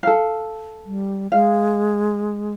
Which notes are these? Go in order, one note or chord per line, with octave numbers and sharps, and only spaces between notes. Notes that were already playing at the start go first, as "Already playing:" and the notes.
A4 F5
G3
G#3 F5